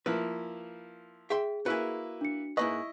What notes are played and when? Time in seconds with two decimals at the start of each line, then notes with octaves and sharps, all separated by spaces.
0.06 F3 A#3 E4 B4
1.30 G#4 E5 G5 C6
1.66 A#3 E4 F#4 B4 G#5
2.21 D4 C#7
2.57 G#2 A#3 E4 B4 D#5 C#6